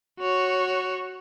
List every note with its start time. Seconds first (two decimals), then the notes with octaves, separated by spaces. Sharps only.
0.19 F#4 C#5